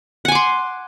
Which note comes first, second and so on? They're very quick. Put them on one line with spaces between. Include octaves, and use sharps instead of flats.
F#5 G#5 D6 C6